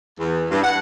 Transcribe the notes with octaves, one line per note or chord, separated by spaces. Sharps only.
E2
G2
F#5